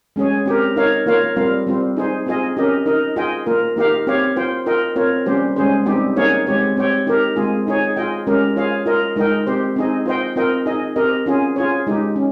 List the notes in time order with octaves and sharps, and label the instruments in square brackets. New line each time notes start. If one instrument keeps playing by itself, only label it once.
[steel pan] G#3 C#4 G#4 C#5
C4 G4 A#4
D#4 A#4 C#5 F5
A#3 F4 A#4 C#5 F5
G3 C4 F4 A#4 F5
G3 C4 F4
D#4 G#4 C5
C4 F4 G#4 D#5
C#4 G4 A#4 D#5
D#4 A#4 D#5
F4 G#4 D#5 G5
A#3 F4 A#4
A#3 D#4 G4 A#4 F5
C4 G4 C#5 F5
F4 C5 G5
F4 A#4 D#5 G5
C4 F4 A#4 C#5
G3 A#3 C#4 G4 C5
G#3 C#4 G#4 C5
G3 C4 D#4 G4
A#3 D#4 G#4 C#5 F5
G#3 C4 G4 C#5
C4 G4 C#5 G5
D#4 G4 A#4
G#3 C4 F4 G#4
D#4 G#4 C#5
F4 G#4 D#5 G5
G#3 C#4 G4 A#4
F4 G#4 C#5 F5
F4 A#4 D#5
G#3 D#4 A#4 D#5 G5
C4 G4 C5
C4 D#4 G#4 D#5
F4 C5 D#5 G5
C4 F4 A#4 D#5 G5
D#4 G#4 D#5
C4 G4 A#4 D#5
C#4 F4 G#4
F4 G#4 C#5
G#3 D#4 G4
C#4